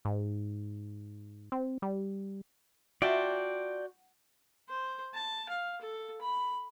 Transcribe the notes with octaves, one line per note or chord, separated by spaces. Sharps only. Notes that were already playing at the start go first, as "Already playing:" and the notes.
G#2
C4
G3
C4 F4 F#4 D5 E5 G5 A5
C5
A5
F5
A4
B5